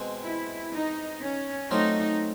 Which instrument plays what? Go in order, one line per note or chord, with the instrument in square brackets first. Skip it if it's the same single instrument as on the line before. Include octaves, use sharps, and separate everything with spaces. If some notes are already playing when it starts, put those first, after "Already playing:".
Already playing: [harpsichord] B2 G#3 C4
[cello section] E4
D#4
C#4
[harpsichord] F#3 A3 C4 F4 [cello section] D#4